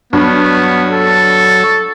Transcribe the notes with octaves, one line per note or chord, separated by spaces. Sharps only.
G2 F#3 B3 C#5
A4